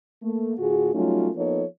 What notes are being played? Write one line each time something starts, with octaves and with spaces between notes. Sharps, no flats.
A3 A#3
A2 D3 F4 F#4 G#4
F#3 G3 A3 C#4 D#4 F4
F3 A#3 B3 D#4 A4 C#5